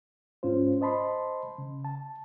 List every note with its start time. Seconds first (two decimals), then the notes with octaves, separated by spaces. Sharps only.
0.43 G#2 C#4 F4 C5
0.81 C5 D#5 A5 B5 C6
1.58 C#3
1.85 A5